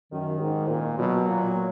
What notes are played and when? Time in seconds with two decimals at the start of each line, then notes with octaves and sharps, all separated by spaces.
0.12 F#2 D#3
0.40 G#2
0.70 A#2
0.98 B2 F#3
1.27 A#2